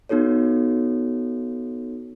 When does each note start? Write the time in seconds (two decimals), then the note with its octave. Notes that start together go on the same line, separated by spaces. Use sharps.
0.09 B3 D#4 F#4 A4 C#5